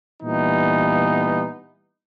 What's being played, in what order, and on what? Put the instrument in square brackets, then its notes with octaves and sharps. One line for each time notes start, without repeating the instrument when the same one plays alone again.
[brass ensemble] A#2 E3 G3 B3 D#4